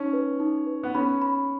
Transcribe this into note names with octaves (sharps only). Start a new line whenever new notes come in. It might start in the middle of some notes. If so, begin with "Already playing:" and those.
Already playing: C#4 D#4
B4
D#4
B4
B3
C#4 B5
B5